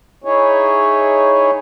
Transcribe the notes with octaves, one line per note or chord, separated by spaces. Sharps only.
D#4 E4 G#4 C#5